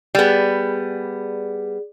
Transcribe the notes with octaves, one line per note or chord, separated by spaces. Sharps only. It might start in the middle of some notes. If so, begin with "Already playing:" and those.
G3 B3 G#4 D5